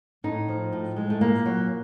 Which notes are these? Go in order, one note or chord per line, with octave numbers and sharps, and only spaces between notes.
A2 D#4
F3
A2
G#3
A3
A#2 A#3
F#3